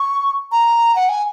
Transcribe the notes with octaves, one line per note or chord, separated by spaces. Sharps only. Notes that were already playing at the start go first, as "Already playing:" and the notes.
Already playing: C#6
A#5
F#5
G#5